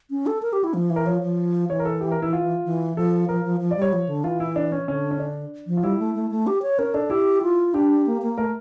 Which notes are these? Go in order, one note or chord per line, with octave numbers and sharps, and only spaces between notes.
C#4
A4
A#4
G4
E4
F3
E3
A#4
F3 C#5
F3
E3 C#5
A#4
A4
G4
A#4
E4
F4
E3
F3 A4
F3 A#4
F3
F3
D5
G3
C#5
F3
D3
E3 F4
E4
D4
C#4
D3 C#4
C#4
D4
F3
F4
G3 E4
A3
A3
A3
G4
C#5
C#4 A#4
D4 A4
E4 G4
F4
D4 G4
A#3
A#3
A3 A#4